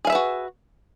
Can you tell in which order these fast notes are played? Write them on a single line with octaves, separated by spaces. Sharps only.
G#4 F5 E5 B4 F#4